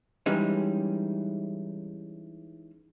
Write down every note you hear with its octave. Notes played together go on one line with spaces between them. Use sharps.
E3 G3 G#3 C#4 D#4